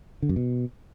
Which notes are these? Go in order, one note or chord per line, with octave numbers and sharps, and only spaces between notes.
D3
F#2
B2